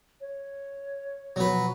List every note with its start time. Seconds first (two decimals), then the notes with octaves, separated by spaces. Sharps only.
0.21 C#5
1.36 B2 F3 F#3 F#4 B4